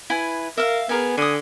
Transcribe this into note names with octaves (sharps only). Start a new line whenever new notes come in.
E4 B4 G#5
A#4 E5 F5
B3 G#4 A#4 G#5
D3 G#5 D#6